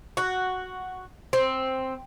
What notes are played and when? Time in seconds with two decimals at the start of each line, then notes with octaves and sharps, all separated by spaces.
0.17 F#4
1.33 C4